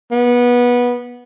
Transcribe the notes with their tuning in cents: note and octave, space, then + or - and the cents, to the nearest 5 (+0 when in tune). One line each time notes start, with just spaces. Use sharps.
B3 -20